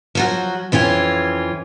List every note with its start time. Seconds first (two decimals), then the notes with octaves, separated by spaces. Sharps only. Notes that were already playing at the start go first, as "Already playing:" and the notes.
0.15 F3 F#3 F#4
0.72 F2 E3 C#4 F4